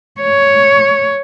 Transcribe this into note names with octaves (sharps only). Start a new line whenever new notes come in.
C#5